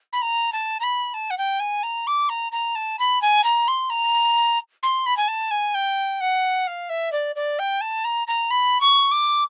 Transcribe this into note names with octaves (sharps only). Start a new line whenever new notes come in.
B5
A#5
A5
A#5
B5
A5
F#5
G5
G#5
A#5
D6
A#5
A#5
A5
B5
G#5
A#5
C6
A#5
C6
B5
G#5
A5
G#5
G5
F#5
F5
E5
D5
D5
G5
A5
A#5
A#5
B5
C#6
D6